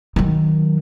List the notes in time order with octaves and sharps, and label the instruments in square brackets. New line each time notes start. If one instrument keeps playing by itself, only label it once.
[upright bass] D#3 F#3